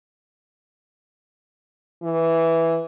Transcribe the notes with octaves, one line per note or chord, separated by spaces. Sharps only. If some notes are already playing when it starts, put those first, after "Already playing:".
E3